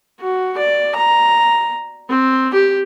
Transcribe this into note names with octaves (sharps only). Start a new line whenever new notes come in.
F#4
D5
A#5
C4
G4